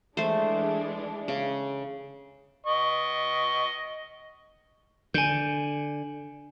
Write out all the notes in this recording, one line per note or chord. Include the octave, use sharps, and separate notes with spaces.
E3 G#3 A3 D4 C5
C#3
D#5 C#6
D3 G#5 G6